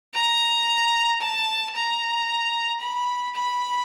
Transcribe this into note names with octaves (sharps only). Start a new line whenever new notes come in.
A#5
A5
A#5
B5
B5